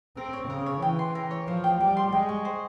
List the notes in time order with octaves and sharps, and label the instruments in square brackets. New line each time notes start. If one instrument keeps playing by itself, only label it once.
[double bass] C4 [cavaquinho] A#4
[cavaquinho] C#5
[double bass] C#3 [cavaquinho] A#4
[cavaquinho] C#5
[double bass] E3 [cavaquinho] G5
[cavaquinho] C6
A#4
C#5
[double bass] F3 [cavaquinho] C5
[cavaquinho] G5
[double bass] G3 [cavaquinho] G5
[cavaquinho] C6
[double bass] G#3 [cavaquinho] G5
[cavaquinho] C#6
C5